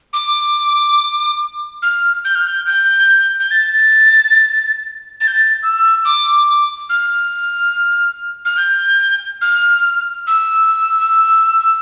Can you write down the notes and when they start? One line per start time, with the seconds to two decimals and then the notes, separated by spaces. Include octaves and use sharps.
0.13 D6
1.82 F6
2.25 G6
2.35 F6
2.47 G6
2.67 G6
3.40 G6
3.51 A6
5.21 A6
5.27 G6
5.34 A6
5.63 E6
6.05 D6
6.90 F6
8.45 F6
8.57 G6
9.42 F6
10.27 E6